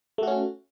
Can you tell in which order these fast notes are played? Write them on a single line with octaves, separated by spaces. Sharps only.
A3 F#4 C#4